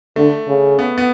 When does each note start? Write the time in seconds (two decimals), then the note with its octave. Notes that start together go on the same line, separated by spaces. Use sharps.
0.16 D3 A3
0.48 C#3
0.79 B3
0.98 B3